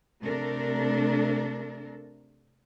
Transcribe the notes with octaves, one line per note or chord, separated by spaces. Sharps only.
C3 A3 D4 A4 A#4